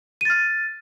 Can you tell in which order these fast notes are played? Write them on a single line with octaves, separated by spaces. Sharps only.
D#7 A6 F6